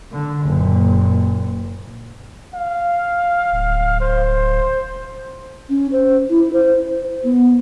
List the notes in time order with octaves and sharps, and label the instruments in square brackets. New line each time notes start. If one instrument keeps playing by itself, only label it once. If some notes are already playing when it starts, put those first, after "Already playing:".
[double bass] D3
F#1 A#2
[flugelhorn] F5
[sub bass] D1
[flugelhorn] C5
[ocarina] C#4
C5
E4
C5
B3